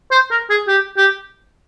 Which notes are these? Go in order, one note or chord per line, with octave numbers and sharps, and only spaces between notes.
C5
A#4
G#4
G4
G4